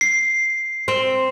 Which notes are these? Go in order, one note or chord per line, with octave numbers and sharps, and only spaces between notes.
C7
C4